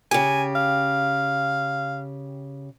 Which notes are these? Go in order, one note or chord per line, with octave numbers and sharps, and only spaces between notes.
C#3 G4 G#5
F5